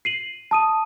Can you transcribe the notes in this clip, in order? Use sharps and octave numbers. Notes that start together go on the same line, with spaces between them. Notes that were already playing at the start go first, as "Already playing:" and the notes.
C7 D#7 F#7
A5 D#6 D#7